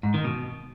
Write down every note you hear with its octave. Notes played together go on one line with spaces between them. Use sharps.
G#2
D#3
B2